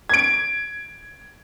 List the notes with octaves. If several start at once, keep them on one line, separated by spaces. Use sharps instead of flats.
G#6 D7